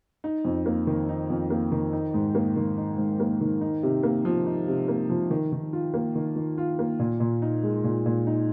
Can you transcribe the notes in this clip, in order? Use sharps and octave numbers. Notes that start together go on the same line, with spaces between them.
D#4
F2
A#3
D#3
D#4
F2
A#3
D#3
D#4
G#2
A#3
D#3
D#4
G#2
A#3
D#3
D#4
C3
A#3
F3
D#4
C3
A#3
F3
D#3
D#3
F4
A#3
D#3
D#3
F4
A#3
A#2
A#2
D#4
G#3
A#2
A#2
D#4